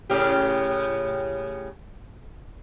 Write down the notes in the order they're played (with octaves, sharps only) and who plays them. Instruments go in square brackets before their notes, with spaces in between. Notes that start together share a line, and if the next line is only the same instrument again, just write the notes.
[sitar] A2 C#3 G4